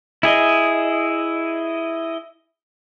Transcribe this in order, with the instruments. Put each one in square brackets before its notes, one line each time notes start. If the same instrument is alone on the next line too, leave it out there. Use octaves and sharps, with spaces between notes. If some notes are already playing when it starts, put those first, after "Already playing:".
[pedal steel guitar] E4 G#4 D#5